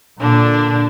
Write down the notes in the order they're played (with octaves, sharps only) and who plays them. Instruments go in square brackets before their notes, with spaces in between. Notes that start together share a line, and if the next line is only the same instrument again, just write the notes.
[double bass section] A#2 [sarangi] D3 [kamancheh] D4